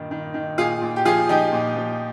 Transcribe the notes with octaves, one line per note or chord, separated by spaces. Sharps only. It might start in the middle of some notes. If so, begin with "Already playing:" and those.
Already playing: G2 A#2 D#3
D#3
D#3
A#2 F4 G#4
A#2
G4
F3 F4 G#4
F3 D#4 G4
A#2
F3